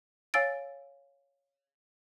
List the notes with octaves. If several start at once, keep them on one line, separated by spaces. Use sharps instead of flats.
C#5 F5 G#5 E6 A6 D7